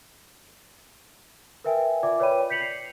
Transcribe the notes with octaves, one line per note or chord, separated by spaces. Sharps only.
A#4 B4 E5 G5 G#5
F4 D5 E5 D6
B4 C#5 D5 G5 B5 D#7
G6 B6 C#7 F7 F#7
C7